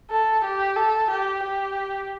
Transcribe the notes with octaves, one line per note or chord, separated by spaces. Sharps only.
A4
G4
A4
G4
G4